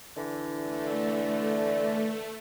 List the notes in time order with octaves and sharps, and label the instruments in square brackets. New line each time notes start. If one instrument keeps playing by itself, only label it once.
[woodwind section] D3 E3
[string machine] A3